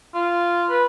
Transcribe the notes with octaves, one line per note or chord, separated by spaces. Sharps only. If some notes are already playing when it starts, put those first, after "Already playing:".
F4
B4